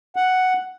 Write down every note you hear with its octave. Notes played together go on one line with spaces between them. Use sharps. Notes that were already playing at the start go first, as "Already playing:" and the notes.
F#5